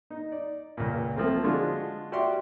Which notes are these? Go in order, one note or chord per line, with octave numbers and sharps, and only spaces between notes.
D#4
D5
C#2 A#2
F3 A3 A#3 C4
D3 G#3 D4 F4 F#4
F#4 G4 D5 E5 C6